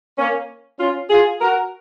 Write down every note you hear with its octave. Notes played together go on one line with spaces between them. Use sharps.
A#3 C#4
C#4 F4
F4 G#4
F#4 A#4